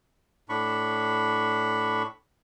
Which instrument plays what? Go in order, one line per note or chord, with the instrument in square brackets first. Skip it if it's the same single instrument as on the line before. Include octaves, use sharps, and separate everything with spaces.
[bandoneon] A2 D4 B5 C#6